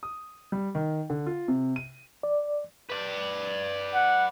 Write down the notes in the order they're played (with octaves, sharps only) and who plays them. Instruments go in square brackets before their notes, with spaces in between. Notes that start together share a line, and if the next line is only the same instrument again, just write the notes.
[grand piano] D#6
G3
D#3
D3
F4
C3
D#7
[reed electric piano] D5
[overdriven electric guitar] B4 D5
[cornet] F#5